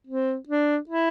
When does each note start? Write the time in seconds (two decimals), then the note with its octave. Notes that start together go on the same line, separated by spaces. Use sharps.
0.07 C4
0.49 D4
0.89 E4